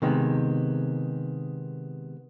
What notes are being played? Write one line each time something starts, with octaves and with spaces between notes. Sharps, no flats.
C3 D#3 G#3 B3